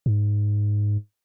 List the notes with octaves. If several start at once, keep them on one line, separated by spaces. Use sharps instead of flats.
G#2